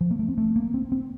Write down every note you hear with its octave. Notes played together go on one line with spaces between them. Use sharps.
F3
A#3
A3
C4
A3
A#3
C4
C4